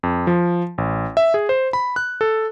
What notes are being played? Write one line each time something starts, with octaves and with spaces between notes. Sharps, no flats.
F2
F3
A1
E5
G#4
C5
B5
F#6
A4